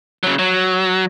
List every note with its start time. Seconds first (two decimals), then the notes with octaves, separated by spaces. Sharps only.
0.24 C#3 F#3
0.39 F#3